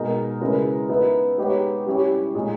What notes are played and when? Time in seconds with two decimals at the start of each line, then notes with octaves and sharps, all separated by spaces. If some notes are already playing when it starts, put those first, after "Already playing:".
Already playing: B2 G#3 D#4 A#4
0.41 C#3 G#3 B3 E4 A#4
0.89 B3 D#4 A#4 E5
1.38 G#3 B3 D#4 G4 C#5
1.86 G3 C#4 E4 G4 C#5
2.34 A#2 G#3 D#4 G#4